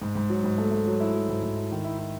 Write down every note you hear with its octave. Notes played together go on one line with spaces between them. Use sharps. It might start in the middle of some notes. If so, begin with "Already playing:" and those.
G#2
G#2
F#3
G#2
A3
A3
F#3
E4
F#3
G#2
G#2
E4
D#3
E4
E4